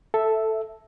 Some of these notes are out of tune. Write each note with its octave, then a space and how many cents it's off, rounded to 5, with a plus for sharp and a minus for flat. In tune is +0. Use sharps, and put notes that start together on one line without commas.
A4 +0 E5 +0